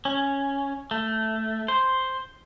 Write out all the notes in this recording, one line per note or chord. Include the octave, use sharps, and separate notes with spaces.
C#4
A3
C5